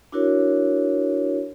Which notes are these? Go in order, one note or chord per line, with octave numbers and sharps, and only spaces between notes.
D4 E4 F#4 A#4 C#5